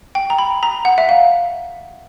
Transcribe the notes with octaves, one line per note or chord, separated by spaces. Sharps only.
G5
A#5
B5
A#5
F#5
E5
F5